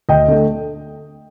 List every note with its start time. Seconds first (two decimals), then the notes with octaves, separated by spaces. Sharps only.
0.09 D2 D#5 G5
0.28 D3 A3